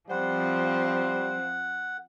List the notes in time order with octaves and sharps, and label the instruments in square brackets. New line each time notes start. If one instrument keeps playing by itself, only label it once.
[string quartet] F3 C4 [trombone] G3 [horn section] C5 [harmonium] F#5